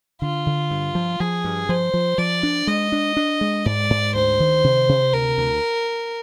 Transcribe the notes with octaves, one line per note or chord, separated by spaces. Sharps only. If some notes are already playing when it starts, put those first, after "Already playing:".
D3 F4
D3
G2
F3
F3 G#4
G2
F3 C5
F3
F3 D5
D4
G#3 D#5
D4
D4
G#3
G#2 D5
G#2
D2 C5
D#3
C3
C3
D2 A#4
D2